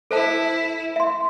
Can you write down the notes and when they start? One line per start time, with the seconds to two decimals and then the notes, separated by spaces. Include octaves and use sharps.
0.11 E4 A4 C5 A5
0.96 E5 C6